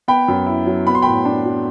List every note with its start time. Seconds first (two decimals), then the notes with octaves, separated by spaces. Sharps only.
0.08 B3 G5 B5
0.28 F#2
0.46 E4
0.66 F#3
0.86 B3 B5
0.95 C6
1.02 A2 G5 B5
1.25 D4
1.45 F#3